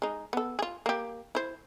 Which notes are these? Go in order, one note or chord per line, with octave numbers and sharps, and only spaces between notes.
G#3 D#4
B3 A4
F4 G#4
A#3 G4
E4 C5